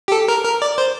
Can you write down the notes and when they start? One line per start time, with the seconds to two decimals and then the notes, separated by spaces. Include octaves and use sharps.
0.08 G4
0.12 A4
0.28 A#4
0.44 A#4
0.62 D5
0.78 C5